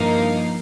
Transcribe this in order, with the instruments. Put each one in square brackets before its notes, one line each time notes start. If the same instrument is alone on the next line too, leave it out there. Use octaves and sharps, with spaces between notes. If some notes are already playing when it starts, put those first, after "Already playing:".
Already playing: [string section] G2 F3 A#3 D#4 F5